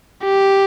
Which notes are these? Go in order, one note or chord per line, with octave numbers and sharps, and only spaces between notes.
G4